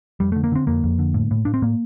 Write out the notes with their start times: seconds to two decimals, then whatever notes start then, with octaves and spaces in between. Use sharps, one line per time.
0.20 F2 G3
0.32 D3 A3
0.44 A#3
0.52 D3 C4
0.67 F2 A#3
0.84 F2
0.99 D3
1.14 A2
1.31 A2
1.45 A2 D4
1.54 C4
1.62 A2 A#3